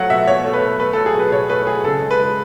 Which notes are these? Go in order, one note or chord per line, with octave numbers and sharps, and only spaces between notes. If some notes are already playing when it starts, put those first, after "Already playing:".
Already playing: F#3 A3 F#5
B2 E5
B2 C#5
A3
B4
F#3
A3 B4
A4
F#3
G#4
B2
B4
B2 C#5
A3 B4
F#3 G#4
C#3 A4
G#3
B4
G#3